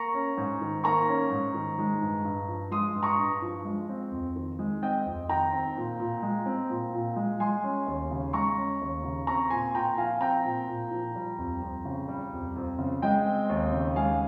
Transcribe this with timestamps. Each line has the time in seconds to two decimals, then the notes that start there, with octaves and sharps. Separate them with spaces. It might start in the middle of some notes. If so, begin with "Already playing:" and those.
Already playing: A#3 A#5 C#6
0.14 C#4
0.37 G#2
0.61 D#3
0.84 A#3 A#5 C#6
1.08 C#4
1.30 G#2
1.54 D#3
1.78 G#3
2.02 G2
2.24 G2
2.48 F3
2.71 G#3 C6 D#6
2.95 G2
3.03 A#5 C#6
3.19 G2
3.42 F3
3.65 G#3
3.89 C4
4.12 F2
4.36 D#3
4.59 G#3
4.82 C4 D#5 G5
5.06 F2
5.29 D#3 G5 A#5
5.53 C4
5.77 A#2
6.00 A#2
6.23 G#3
6.46 C4
6.70 A#2
6.94 A#2
7.16 G#3
7.40 G#3 G#5 C6
7.63 C#4
7.86 D#2
8.11 C#3
8.33 G#3 A#5 C#6
8.57 C#4
8.81 D#2
9.03 C#3
9.27 C4 A#5 C#6
9.50 A#2 G#5 C6
9.74 A#2 G5 A#5
9.97 F3 F5 G#5
10.21 C4 G5 A#5
10.44 A#2
10.67 A#2
10.91 F3
11.15 G3
11.38 F2
11.62 F2
11.85 C#3
12.08 G3
12.33 F2
12.56 F2
12.78 C#3
13.02 G#3 D#5 G5
13.25 C4
13.49 D#2
13.72 C#3
13.96 G#3 F5 G#5